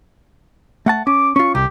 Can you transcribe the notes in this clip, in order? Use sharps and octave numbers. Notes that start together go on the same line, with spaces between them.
A3 F#5 A5
C#4 D6
C#4 F4 C#6
C2 G4